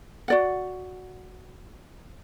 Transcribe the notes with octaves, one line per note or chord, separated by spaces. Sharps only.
F#4 D5 F#5